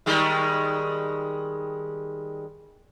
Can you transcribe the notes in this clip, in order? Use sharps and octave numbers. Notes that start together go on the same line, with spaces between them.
D#3 G3 G#3